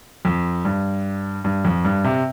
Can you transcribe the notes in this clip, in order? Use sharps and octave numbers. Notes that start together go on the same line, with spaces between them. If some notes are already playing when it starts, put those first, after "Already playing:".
F2
G2
G2
F2
G2
C3